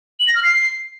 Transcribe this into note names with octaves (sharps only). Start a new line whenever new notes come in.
F#7
A#6
F6
C7